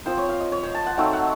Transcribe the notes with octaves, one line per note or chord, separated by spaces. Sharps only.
F3 C4 F4 C5
C#5
F5
D#5
C#5
C5
A5
F#5
F#3 A3 C4 D#4 F5
F#5